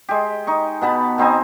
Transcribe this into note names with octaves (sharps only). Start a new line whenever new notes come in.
G#3 G4
D#4 C#6
B2 B3 A5 B5
B2 C4 D#4 G#5